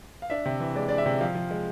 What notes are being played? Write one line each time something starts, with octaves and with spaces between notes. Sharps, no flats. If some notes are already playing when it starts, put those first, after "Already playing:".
F5
D4 E5
C3
E3
G#3 D5
D4 D5
E5
C3
F3 F5
F3
G#3